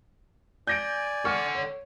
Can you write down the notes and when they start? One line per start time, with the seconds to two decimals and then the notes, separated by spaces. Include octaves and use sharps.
0.67 D5 G#5 G6 A#6 D7
1.25 A4 F#5 C#6 F6
1.55 C#5